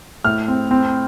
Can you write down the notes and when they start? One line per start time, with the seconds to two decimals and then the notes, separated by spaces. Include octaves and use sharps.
0.24 A2 F6
0.48 C4
0.71 C4